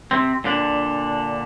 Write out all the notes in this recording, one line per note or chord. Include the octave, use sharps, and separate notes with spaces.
C3 C4
A#2 D3 D4